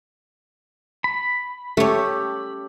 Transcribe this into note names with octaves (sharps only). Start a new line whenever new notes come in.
B5
A3 C#4 G4 A4 C#5